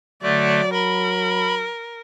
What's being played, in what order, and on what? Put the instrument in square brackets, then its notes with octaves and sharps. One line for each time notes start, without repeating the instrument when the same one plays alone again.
[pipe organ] D3 A3 [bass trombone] F#3 [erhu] D5
[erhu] A#4 [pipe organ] B5